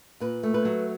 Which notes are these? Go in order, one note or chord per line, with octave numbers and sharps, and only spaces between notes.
A#2 B4
A3
B4
F#3